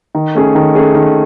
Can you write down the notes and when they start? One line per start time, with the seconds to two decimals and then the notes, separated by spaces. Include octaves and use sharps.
0.15 D#3
0.35 A3 C#4 G#4
0.55 D#3
0.75 A3 C#4 G#4
0.95 D#3